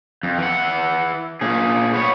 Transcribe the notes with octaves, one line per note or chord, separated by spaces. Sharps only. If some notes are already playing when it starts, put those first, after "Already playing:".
F2
E3 F#5
A#2 G#4
B3 C#5